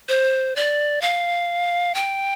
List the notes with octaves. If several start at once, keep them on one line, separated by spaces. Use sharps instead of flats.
C5
D5
F5
G5